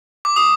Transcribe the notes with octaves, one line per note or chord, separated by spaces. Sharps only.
D6
D#6